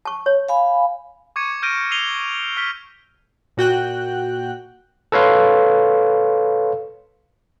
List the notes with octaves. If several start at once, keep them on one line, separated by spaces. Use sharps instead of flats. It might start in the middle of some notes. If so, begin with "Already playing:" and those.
A5 C#6
C#5
F5 G#5 B5
C#6 D6 G#6 C#7 D#7
F6 G6 A#6 D7 D#7
E6 C7 D#7 F7 G7
F6 B6
A#2 F#4 G5 F#6
A4 B4 C#5 F5 C6